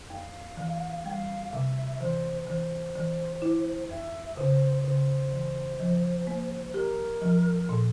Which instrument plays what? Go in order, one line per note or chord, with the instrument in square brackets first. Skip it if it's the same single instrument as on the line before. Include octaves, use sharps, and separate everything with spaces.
[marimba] F2 [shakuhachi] F5
[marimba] E3
[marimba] G3 [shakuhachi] F5 G5
[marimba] C3 [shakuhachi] E5
[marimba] E3 [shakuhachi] C5
[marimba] E3 [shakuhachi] C5
[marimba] E3
E4
[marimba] F2 [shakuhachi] E5
[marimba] C#3 [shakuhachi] C5
[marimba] C#3 [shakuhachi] C5
[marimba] E3
F3
A#3
[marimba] G4 [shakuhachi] A#4
[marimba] F3
A#2